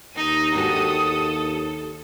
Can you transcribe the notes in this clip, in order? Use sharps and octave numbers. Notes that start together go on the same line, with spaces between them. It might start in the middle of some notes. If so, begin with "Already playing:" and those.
D#2 D#4 D#6
D4 F#4 G4 A4